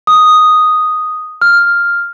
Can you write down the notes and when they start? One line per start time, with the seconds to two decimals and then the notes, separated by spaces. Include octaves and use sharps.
0.07 D#6
1.42 F6